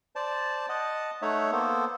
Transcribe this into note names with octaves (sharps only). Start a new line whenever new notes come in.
C5 D5 A5
D#5 F#5 A5
A3 D#4 C#5 E5 F#5
A#3 B3 A4 C5